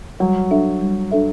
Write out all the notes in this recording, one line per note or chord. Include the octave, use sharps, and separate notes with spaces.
F#3 G3
D4 A4 E5
G3
D4 A4 E5